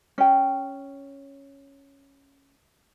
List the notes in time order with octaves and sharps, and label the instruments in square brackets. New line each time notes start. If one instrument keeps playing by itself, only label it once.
[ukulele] C#4 G5